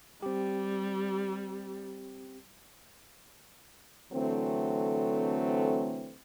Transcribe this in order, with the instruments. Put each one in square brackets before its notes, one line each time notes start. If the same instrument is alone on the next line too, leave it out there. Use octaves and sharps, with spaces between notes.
[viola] G3 [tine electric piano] C4 G4
[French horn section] D3 E3 F#3 A3 C4